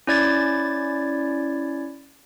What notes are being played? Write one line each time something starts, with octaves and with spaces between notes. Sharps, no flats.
C#4 E4 D5 G#6 A6